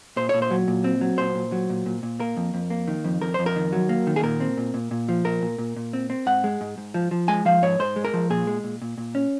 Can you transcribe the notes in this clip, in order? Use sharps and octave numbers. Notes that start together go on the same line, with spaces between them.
A#2 C5
A#2 C#5
C5
F#3
A#2
C4
F#3
A#2 C5
A#2
F#3
A#2
A#2
A#2
A#3 A#4
F2
F2
A#3
D#3
F2
F2 A#4
F2 C5
A#4
D#3
F#3
A#3
D#3
G#4
A#2 A#4
C4
A#2
A#2
A#2
F3
A#2 A#4
A#2
A#2
A#2
C4
C4
G#2 F#5
G#3
G#2
G#2
F3
F3
G#3 G#5
F3 F5
G#2 C#5
G#2 C5
G#3
A#4
F3
A#2 G#4
G#3
A#2
A#2
A#2
C#4